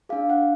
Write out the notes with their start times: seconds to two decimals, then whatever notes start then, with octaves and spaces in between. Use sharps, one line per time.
0.09 D4 G#4 F5
0.30 F#5